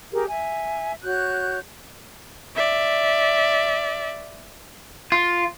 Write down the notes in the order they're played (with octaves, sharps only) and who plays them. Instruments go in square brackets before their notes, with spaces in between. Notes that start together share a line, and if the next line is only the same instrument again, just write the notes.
[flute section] G4 G#4 A#4
E5 G#5
F#4 C#5 F#6 G6
[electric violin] D5 E5
[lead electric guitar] F4